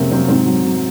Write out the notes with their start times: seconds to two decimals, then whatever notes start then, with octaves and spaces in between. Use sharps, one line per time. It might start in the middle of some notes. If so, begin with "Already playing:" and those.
Already playing: F2 C3 G#3 A#3 C4 C#4
0.10 F#3 C4
0.28 G#2 C4
0.46 F#3
0.64 F#3